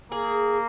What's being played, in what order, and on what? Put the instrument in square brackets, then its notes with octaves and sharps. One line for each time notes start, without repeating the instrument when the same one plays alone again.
[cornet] A#3 [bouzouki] G#4